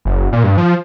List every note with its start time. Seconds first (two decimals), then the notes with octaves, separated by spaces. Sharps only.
0.05 F#1
0.32 A#2
0.44 G2
0.58 F3